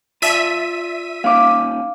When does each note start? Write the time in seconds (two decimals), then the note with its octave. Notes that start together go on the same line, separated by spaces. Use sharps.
0.22 F4 D5 E5 A5 B6 D#7
1.24 A#3 C#4 D#4 F5 D6